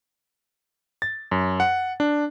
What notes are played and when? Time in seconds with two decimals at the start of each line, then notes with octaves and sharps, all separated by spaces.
1.02 A6
1.31 F#2
1.60 F#5
2.00 D4